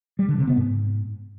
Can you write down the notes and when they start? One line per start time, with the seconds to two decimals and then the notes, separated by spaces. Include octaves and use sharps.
0.19 G3
0.28 D3
0.38 C3
0.47 B3
0.57 G#2